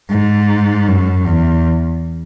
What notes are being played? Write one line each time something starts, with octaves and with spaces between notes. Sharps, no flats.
G#2
F#2
E2